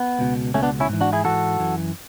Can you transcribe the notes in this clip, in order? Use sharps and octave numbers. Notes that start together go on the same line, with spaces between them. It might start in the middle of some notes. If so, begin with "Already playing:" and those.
Already playing: B3
C#2 B2
C#2 B2 A3 C#4
B3 D4
C#4 E4
G#2 E3
D4 F#4
E4 G#4
G#2 E3 F#4 A4
F#2 E3